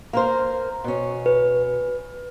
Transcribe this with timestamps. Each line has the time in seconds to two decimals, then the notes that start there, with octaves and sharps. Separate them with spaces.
0.13 A#3 A#4 C5
0.84 B2 C#4
1.26 B4